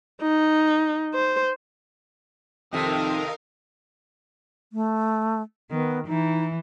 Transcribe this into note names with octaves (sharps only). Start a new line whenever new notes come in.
D#4
C5
F2 C3 D#3 D#4 A4 A#4 F5 D#6
A3
D#3 B3
E3 D#4